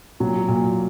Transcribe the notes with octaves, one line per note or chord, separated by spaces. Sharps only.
A#2 F#3
A#2